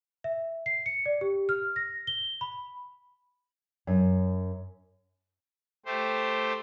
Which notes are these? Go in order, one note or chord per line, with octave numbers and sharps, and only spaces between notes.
E5
C7
C#7
D5
G4
F6
A#6
G7
B5
F#2
A3 G4 C5